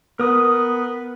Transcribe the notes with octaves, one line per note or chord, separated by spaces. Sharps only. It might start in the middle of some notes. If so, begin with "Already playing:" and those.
B3 A#4 D#6